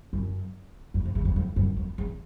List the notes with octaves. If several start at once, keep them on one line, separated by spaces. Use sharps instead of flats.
F#2
F2
F2
E2
F2
F2
F#2
F2
E2